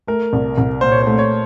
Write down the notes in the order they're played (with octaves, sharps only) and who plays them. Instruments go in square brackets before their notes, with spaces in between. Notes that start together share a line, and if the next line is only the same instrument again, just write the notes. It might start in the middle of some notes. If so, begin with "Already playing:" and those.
[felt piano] A3 [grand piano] A#4
[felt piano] C2
C2
[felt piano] A#2 [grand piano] C5
[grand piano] C#5
C5
[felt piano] A3
[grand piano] C#5